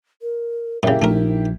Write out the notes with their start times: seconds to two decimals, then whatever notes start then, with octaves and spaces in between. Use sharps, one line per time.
0.22 A#4
0.83 F#2 C#3 A#3 E4 G4 E5
1.02 A#1 A3 D#4 A#4